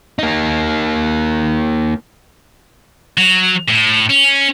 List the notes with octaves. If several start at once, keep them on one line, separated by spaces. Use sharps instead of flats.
A#3 D#4
F#3
A2
C#4